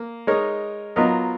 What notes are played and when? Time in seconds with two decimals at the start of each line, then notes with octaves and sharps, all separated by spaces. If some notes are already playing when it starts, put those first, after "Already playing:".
Already playing: A#3
0.27 G#3 D#4 A#4 C#5
0.96 F#3 B3 F4 A#4 D#5